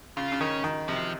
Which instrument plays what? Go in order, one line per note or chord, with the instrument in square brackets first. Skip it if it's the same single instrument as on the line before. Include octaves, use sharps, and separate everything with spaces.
[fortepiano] C#3 [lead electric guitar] F4
[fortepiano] C#3
[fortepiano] D#3 [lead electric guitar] C#4
[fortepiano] D#3
[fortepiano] C3 [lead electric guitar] F3